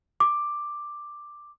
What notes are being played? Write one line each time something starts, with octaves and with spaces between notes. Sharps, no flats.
D6